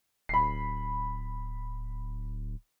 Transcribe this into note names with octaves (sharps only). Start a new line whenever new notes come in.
D1 B5 C7